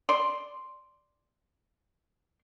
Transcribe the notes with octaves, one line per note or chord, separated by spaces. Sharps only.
D5 C6